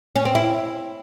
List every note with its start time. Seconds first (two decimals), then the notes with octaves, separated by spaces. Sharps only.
0.16 C#4
0.25 C4
0.35 E4